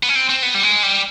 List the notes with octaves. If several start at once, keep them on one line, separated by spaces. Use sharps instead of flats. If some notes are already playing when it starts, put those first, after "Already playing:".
B3
C#4
C4
C4
B3
G3
G#3
G3